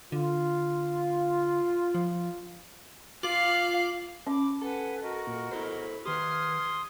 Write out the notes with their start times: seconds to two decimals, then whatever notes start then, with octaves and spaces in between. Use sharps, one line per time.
0.12 D3 F4
1.95 F3
3.23 F4 F5 D6 F#7
4.27 C#4 B5 D6
4.62 A4 B4 F#5 G#5
5.01 F#4 A#4 D#5
5.27 A#2
5.51 E4 A4 C5 B5
6.05 D#3 G4 B4 C6 D#6 F6 G#6